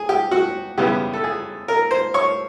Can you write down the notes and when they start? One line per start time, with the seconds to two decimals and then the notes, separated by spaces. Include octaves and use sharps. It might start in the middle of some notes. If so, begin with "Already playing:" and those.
Already playing: G#4
0.09 G4
0.31 F#4
0.78 F#2 C#3 E3 G3 B3 G4
1.13 A4
1.24 G#4
1.68 A#4
1.91 C5
2.14 C#5